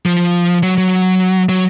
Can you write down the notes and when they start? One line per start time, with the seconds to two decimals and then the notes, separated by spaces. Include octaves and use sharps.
0.06 F3
0.63 F#3
0.78 F#3
1.49 F#3